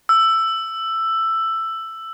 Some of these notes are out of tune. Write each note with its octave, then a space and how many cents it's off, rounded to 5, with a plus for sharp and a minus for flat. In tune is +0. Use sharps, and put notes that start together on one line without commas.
E6 +10